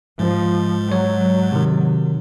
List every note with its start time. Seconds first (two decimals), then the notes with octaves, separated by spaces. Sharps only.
0.19 G#2 F3 G#3
0.92 F#3 C#5
1.52 C3 D#3